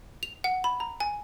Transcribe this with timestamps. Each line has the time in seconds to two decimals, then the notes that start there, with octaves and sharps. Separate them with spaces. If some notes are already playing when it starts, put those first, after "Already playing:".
0.23 F7
0.44 F#5
0.64 B5
0.80 A#5
1.00 G#5